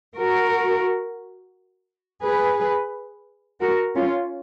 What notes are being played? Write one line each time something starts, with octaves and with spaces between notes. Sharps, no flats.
F#4 A#4
G#4 B4
F#4 A#4
C#4 F4